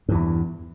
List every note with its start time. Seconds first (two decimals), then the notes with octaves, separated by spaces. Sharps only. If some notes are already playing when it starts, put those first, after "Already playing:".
0.09 G2
0.11 E3
0.14 E2